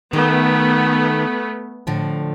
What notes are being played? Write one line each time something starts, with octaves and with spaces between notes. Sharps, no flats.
D#3 A3 B3
A2 D3 F3